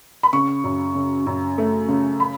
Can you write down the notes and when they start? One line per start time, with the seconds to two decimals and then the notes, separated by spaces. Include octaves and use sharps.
0.23 B5
0.33 C#3 C#6
0.64 F#2
0.95 C#3
1.27 F#2
1.58 A3
1.88 C#3
2.20 B5